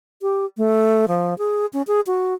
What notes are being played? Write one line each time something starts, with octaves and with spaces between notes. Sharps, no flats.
G4
A3
F3
G#4
C#4
G#4
F#4